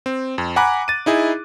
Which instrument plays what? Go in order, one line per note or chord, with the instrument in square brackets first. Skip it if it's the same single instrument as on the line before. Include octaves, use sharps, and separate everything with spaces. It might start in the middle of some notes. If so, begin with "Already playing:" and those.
[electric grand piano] C4
F2
F#5 G#5 A#5 B5 D6 F#6
A6 D#7
D#4 E4 G#4